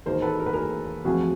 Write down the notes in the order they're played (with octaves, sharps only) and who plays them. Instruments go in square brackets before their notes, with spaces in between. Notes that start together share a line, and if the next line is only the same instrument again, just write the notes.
[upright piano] E1 D#2 D#3 G#3 A#4 C5
A4 B4
A#4
B4
G#4 A#4
E1 D2 C3 F3 F#4 G#4